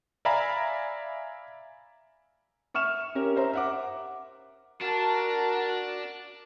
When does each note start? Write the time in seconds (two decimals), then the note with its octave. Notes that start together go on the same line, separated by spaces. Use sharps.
0.25 D5 E5 F5 G#5 A#5 B5
2.74 E5 C#6 F6 E7
3.15 C#4 G4 A#4
3.36 C5 E5 A#5
3.53 E5 F#5 D6
4.81 D4 F4 F#4 A#4 A5